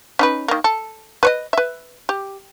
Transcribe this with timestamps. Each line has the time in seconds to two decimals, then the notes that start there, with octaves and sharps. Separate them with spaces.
0.19 C#4 D#4 B4
0.48 D#3 A#3
0.64 A4
1.23 B4 C#5 D#5
1.53 B4 E5
2.09 G4